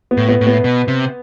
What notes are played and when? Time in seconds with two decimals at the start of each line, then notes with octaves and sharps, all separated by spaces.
0.11 B3
0.17 A2
0.29 B3
0.41 A2
0.47 B3
0.64 B2
0.88 C3